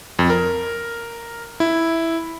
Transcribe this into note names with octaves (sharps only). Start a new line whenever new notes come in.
F2
A#4
E4